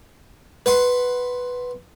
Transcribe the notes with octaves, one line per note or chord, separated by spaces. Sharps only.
B4 F#5 C6